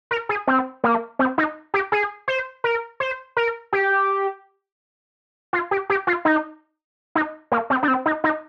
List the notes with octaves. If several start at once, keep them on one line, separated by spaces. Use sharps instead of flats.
A#4
G#4
C4
A#3
C4
D#4
G4
G#4
C5
A#4
C5
A#4
G4
F4
G4
G4
F4
D#4
D#4
A#3
C4
D4
C4
D#4
D#4